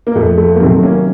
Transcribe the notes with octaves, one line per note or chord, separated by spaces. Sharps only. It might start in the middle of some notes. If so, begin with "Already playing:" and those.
A#3
F2 A3
A3
A#3
C3 D#3 F#3 A3 C4
A#3 C#4